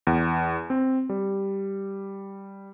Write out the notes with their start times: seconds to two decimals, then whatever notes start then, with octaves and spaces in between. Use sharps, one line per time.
0.07 E2
0.70 C4
1.09 G3